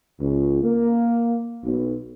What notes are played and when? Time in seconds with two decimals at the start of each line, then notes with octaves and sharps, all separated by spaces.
0.20 C#2
0.62 A#3
1.64 B1